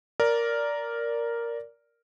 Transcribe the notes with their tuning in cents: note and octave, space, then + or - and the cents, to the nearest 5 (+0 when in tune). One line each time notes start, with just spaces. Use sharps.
A#4 +0 D5 -10